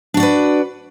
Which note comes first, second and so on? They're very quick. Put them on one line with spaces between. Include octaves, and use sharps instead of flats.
D4 F#4 D5 B4